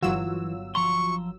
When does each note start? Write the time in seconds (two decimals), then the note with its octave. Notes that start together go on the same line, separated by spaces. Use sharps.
0.02 G1 E3 F#3 F4 F#4 E6
0.75 F3 A#5 C6 C#6